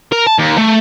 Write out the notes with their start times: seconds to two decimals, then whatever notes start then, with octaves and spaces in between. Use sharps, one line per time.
0.12 A#4
0.27 A5
0.39 D#2
0.58 A3